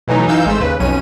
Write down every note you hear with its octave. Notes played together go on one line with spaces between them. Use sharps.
B2 E3 F#3 A3 D#4
F#2 E3 D#4 F5 E6 G6
G#1 G#3 A3 C5 E6
D#2 C#3 B4
B1 F2 B2 C#4 D#7